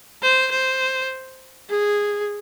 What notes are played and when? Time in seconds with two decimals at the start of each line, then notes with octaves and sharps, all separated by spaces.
0.22 C5
0.51 C5
1.69 G#4